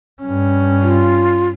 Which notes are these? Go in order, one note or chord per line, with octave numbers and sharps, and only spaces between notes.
G2 C#4
F4